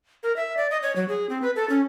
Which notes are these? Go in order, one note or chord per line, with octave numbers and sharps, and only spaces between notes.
A#4
E5
D5
D#5
C#5
F#3
G#4
C4
B4
A4
C#4